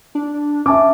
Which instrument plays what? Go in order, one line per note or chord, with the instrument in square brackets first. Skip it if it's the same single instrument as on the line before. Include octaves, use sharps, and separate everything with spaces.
[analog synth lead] D4
[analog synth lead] C#4 [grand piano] E5 A5 D6